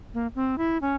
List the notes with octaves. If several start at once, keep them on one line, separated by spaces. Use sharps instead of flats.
A#3
C4
E4
C#4